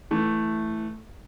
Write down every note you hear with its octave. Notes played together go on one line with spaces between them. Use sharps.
E3 A3